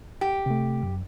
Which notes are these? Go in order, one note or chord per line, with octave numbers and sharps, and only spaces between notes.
G4
C3 A3
F#2